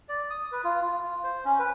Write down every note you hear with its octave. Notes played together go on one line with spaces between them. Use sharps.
D5
D#6
B4
F4
F4
F4
C5
C#4
B4